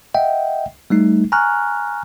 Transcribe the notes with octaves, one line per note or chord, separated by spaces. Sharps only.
D#5 E5 F#5 G5
G3 A3 D#4
G#5 A#5 C#6 F6 F#6